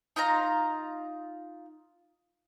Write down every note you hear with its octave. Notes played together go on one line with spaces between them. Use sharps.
D#4 F4 F5 A#5